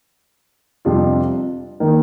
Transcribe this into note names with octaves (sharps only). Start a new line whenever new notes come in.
F2 C3 G3 D4 F4
D#3 A#3